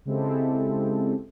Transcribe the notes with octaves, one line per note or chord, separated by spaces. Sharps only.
C#3 G#3 C4 E4 G4 A4